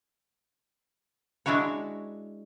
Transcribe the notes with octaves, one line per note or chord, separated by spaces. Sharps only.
G#3 D4 E4 F#4 C#5